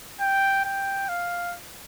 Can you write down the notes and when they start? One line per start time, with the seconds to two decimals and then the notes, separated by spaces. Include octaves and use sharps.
0.20 G5
0.65 G5
1.09 F5